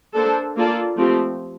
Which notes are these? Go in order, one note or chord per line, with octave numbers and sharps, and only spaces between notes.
A#3 D4 A4 C5
A#3 F4 A4 D5
F3 A3 C4 G4